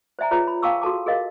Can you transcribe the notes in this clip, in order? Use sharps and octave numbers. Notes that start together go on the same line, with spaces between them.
C5 D5 E5 G#5 A#5
F4 G#4 B4 C#5 E5 A#5
B5
F5 G5 A5 C#6 D6 E6
F#4 G#4 A4 A5 D6
G#4 A#4 D#5 F5